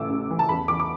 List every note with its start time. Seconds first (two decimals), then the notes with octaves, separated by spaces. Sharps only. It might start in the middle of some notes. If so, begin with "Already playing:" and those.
Already playing: A1 A2 E3 D6 E6
0.10 A1
0.30 E3
0.39 A5
0.49 E2 B5
0.68 E3 D6
0.80 D6